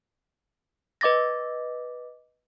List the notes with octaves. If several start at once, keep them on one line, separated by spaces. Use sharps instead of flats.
B4 D#5 D6 A6 A#6